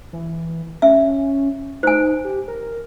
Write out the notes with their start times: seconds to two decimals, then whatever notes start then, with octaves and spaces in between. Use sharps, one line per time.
0.13 E3
0.82 C#4 E5
1.83 D#4 C5 G#5
2.24 G4
2.48 A#4